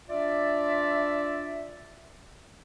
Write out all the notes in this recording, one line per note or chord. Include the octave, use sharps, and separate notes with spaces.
D4 F4 D5 E5